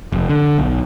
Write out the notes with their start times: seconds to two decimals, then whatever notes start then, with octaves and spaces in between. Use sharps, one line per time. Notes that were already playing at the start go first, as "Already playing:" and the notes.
0.12 F1
0.29 D3
0.58 B1